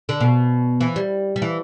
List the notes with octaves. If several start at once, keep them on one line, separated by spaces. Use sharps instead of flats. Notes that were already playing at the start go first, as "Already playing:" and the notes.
D3
B2
E3
G3
G3
E3